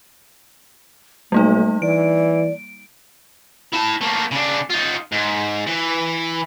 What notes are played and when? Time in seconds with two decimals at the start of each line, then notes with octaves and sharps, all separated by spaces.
1.32 B1 G3 A3 A#3 D#4
1.82 E3 D5 D7
3.73 E4 A5
4.02 A3 A#3
4.32 C#3 D4
4.70 D#4 F4
5.12 G#2
5.67 E3